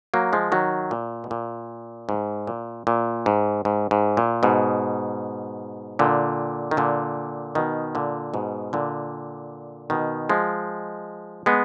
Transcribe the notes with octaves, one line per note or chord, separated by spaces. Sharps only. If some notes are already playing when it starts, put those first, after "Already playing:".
F#3 A#3
F3 G#3
D#3 F#3
A#2
B2
A#2
G#2
A#2
A#2
G#2
G#2
G#2
A#2
G#2 B2
A#2 D3
D#3
A#2 D3
B2 D#3
A#2 D3
G#2 B2
A#2 D3
B2 D#3
F3 G#3
G#3 B3